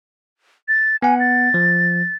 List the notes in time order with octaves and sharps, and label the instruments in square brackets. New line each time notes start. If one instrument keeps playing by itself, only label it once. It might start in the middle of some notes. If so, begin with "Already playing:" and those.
[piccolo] A6
[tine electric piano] B3 F#5 [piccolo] G#5
[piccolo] A6
[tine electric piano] F3